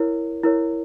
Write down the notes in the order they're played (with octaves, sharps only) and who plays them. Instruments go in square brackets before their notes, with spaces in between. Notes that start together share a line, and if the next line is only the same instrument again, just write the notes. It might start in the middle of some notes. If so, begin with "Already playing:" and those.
Already playing: [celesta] E4 A#4 C#5
E4 A#4 C#5